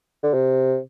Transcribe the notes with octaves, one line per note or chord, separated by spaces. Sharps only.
D3
C3